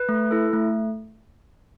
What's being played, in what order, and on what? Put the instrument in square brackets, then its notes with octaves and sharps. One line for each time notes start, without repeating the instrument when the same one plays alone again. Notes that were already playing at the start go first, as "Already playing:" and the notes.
Already playing: [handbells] B4
A3
E4 A4
A3